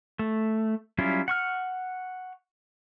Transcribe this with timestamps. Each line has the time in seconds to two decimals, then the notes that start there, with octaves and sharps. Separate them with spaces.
0.19 A3
0.98 F#3 G3 C#4 E4 F4
1.28 F#5 C#6 F6